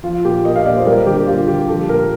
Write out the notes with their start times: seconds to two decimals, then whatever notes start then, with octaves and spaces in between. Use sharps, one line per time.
0.04 F3 F4
0.25 A#2 G4
0.45 A#3 D#5
0.56 F5
0.65 A#2 D5
0.76 C5
0.86 G3 A#4
1.06 D3 G4
1.17 G4
1.27 A#3 F4
1.48 D3 G4
1.68 F3 A4
1.88 A#2 A#4